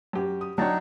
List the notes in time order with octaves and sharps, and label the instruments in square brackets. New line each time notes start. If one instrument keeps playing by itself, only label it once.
[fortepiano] F#2 G4
[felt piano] D#6
[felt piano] F#3 D4 A6 [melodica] D#4 [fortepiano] C#5 G5 A5